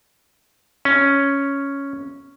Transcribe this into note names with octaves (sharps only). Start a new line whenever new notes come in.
C#4